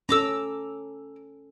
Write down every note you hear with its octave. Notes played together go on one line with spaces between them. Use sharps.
C#4 A4 A#5 D6 E6